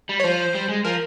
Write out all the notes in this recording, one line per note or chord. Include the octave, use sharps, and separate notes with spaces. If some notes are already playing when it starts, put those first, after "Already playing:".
G3
C#5
F3 C5
G3
G#3
F3 A#4